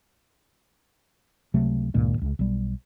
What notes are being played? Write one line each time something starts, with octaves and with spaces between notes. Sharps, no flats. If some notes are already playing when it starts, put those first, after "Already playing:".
C#2 C3 F#3 A3
C#2 G2 A#2 D#3
D#1 C#2
B1 G3